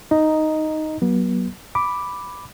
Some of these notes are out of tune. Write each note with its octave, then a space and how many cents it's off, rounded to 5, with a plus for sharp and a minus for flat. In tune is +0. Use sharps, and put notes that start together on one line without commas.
D#4 +0 D#5 +0 A#5 +0
F#3 +15 B3 -40
B5 +0 D6 +0